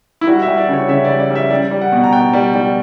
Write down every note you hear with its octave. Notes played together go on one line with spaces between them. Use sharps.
E4
G3 F#4
E5
G3
D5
C#3
C#5
C#3 E5
G3 D5
D5
G3
E5
G3 D5
G3
F#5
B2
A#5
B2 G5
G3
G3